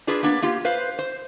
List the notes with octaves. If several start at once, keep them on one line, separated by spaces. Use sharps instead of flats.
D4 F4 G#4 B4 D5
A#3 B3 D4
A#3 F4 G4
B4 C5 F5
C5